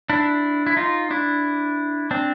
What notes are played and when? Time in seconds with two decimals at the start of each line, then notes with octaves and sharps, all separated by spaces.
0.10 D4 E4
0.67 E4
0.77 D#4 F4
1.10 D4 E4
2.11 C4 D4